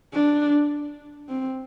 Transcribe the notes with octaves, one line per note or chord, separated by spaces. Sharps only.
D4
C4